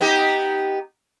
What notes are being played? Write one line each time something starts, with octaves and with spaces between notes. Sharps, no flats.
B3 D#4 G4